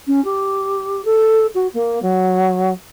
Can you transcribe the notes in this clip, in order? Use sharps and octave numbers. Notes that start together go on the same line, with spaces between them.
C#4
G4
A4
F#4
A#3
F#3